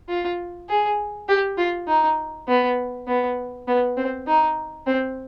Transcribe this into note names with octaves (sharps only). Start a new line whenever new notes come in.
F4
G#4
G4
F4
D#4
B3
B3
B3
C4
D#4
C4